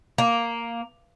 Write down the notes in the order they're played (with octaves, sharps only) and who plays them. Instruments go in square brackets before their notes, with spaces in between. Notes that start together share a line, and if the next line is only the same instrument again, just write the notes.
[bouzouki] A#3